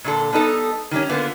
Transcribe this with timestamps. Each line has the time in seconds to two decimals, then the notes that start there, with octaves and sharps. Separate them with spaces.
0.04 A#2 D3 A4
0.32 G3 B3 D#4 A4
0.91 D#3 G3 C#4
1.09 D3 A#3 B3 F4